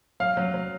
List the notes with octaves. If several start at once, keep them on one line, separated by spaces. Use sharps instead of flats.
F#3 F5
F#3
F#3